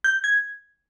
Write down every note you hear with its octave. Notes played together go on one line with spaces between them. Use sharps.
G6
G#6